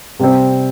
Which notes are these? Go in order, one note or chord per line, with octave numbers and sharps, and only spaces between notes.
C3 G3 C4